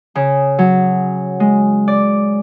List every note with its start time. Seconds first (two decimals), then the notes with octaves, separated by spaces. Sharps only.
0.15 C#3
0.58 F#3
1.40 G#3
1.88 D5